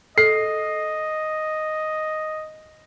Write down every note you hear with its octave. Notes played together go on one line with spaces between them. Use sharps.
A4 D#5 C7